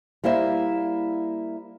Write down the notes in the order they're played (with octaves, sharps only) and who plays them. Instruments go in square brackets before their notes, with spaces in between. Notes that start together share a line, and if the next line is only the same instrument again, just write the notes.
[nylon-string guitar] G3 A#3 E4 C5 E5